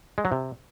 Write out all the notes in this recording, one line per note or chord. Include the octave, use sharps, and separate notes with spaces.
G#3
F#3
C3